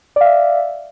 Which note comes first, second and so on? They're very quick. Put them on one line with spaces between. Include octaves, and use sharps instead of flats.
D5 F5 E5